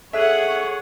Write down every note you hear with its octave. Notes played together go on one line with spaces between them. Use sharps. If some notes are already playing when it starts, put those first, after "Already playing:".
G#4 A4 C#5 E5 F#5 F#6 D#7